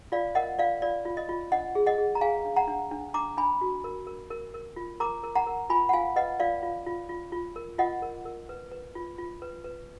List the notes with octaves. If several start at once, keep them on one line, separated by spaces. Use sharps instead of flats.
F4 D5 F5
A#4 D#5 F#5
F4 D5 F5
F4 D5
F4
D#5
F4
D4 D#5 F#5
G#4
D#5 F#5
G#4
A#5
G#4 F5 G#5
D4
F#5 A#5
D4
D4
D4 A#5 D6
D4 G#5 B5
F#4
A#4
A#4
A#4
A#4
F4
A#4 A#5 D6
A#4
F#5 A#5
A#4
F4 G#5 B5
F#5
F4 F5 G#5
B4 D#5 F#5
F4 D5 F5
F4
F4
F4
F4
A#4
F4 D#5 F#5
A#4
A#4
B4
B4
F4
F4
B4
B4